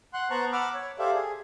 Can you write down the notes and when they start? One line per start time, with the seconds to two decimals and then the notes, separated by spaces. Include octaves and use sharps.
0.14 F#5 C6 F#6
0.30 B3 C5 A5 A#5 C#6 F#6
0.52 F#5 B5 D6 E6 F6
0.74 C#5
0.99 G4 A4 C5 D5 E5 F5
1.14 G#4